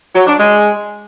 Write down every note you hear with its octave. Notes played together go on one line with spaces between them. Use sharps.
F#3
D4
G#3